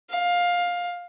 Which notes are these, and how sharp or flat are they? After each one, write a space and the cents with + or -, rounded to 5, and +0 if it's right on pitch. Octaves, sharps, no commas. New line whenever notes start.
F5 +15